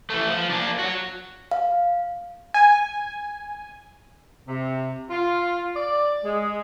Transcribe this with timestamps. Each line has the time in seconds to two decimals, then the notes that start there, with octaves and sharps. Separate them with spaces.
0.10 E3 A3
0.30 F3
0.50 A#3 D4
0.79 F#4 C#5
1.51 F5
2.54 G#5
4.47 C3
5.10 F4
5.76 D5
6.24 G#3